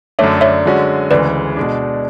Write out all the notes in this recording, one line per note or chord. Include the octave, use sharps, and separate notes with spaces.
F#2 D3 A3 D4 C#5 E5
C#5 E5
F#2 D3 G#3 C#4 F#4
D2 C#3 E3 G#3 B4 D5
B2 G#3 D4